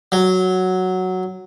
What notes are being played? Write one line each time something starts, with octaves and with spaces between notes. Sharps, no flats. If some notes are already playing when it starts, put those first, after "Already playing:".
F#3